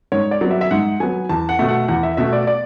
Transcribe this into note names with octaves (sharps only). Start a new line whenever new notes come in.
G#2 C#5
D5
F#3 B3
E5
E5
G#2 F#5
F#3 B3 G#5
E2 A5
F#5
B2 A3
F#5
E2 F#5
E5
B2 A3 E5
D5
D5